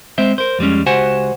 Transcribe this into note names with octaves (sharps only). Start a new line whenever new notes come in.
G#3 C4 C5 E5
A#4 C5
F2 G3 G#3 C#4
C#2 F#4 G4 C5 F#5 G#5